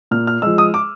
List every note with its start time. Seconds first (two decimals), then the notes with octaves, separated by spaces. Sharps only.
0.11 A#2 F6
0.27 F6
0.42 F3 G#3 E6
0.58 D#6
0.74 D6